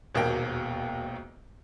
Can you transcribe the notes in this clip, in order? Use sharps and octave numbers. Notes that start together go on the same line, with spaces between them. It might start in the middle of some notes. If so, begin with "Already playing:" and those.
E1 A#1 D#2 B2 A#4 G5